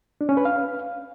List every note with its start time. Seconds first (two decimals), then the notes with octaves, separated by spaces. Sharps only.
0.21 D4
0.29 C#4
0.37 B4
0.45 F5